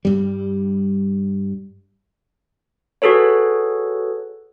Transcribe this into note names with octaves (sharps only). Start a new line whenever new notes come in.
G2 G3
F#4 G#4 A4 B4 C#5